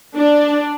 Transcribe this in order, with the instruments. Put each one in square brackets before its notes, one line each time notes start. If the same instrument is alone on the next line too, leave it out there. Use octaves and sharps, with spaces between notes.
[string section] D4